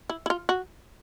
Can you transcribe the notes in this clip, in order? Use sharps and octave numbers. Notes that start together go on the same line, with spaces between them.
E4
E4
F4
F#4